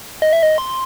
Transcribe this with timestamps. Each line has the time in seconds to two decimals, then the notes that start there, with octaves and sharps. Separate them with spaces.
0.22 D#5
0.33 E5
0.43 D#5
0.58 C6